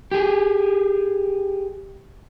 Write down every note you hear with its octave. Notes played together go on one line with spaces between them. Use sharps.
G4 G#4